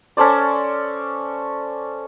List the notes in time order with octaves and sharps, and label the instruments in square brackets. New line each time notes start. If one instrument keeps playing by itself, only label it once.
[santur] C#4 A4 C5 D5